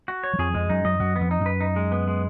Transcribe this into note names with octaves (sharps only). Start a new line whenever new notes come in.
F#4
C#5
F#3
F2 F3 G#4
F2 F3 G#3
F#2 F#3 D#4
F#2 F#3 D#5
F#2 F#3 F#4
B3
F2 F3
D#4
F#2
B4
D#4
G#3
B3
G#3